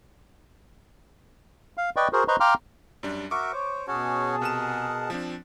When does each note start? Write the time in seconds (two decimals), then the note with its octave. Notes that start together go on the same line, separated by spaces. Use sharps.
1.77 F5
1.96 B4 D5 D#5 G5 C#6
2.13 F#4 G#4 A#4 C5
2.28 B4 C5 D#5 A#5 C6 C#6
2.40 F5 G5 A#5 C6 D6 F6
3.03 F#2 G3 D4
3.31 F#4 A#4 E5 C#6 D6
3.53 C5 C#5
3.87 B2 C#4 F#4 G#4 C#5 A5
4.41 C3 A#4 F#5 D#6 E7
5.10 F3 C4 D4